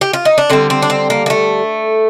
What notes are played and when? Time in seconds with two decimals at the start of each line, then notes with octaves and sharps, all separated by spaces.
0.01 G4
0.13 F4
0.25 D#4
0.38 D4
0.50 D3 G3 C4
0.70 C4
0.82 D4
0.90 C4
1.10 A#3
1.26 A#3
1.30 A3